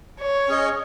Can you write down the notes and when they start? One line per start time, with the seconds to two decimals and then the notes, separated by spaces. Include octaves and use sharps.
0.20 C#5
0.48 C#4 G#4 D#5